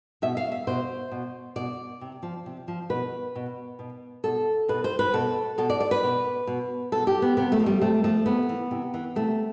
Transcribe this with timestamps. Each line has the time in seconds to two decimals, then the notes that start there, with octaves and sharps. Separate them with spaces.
0.22 B2 E5
0.37 F5
0.52 E5
0.67 B2 C5
1.12 B2
1.56 B2 D5
2.01 C3
2.23 F3
2.46 C3
2.68 F3
2.90 B2 B4
3.35 B2
3.79 B2
4.24 B2 A4
4.68 B2 B4
4.84 C5
4.99 B4
5.13 B2 A4
5.58 B2 A4
5.70 D5
5.80 D5
5.91 B4
6.03 B2
6.47 B2
6.92 B2 A4
7.07 G4
7.22 B3
7.37 C3 B3
7.52 A3
7.60 F3
7.66 G3
7.81 C3 A3
8.04 F3 A3
8.26 C3 B3
8.49 E3
8.71 C3
8.94 E3
9.16 C3 A3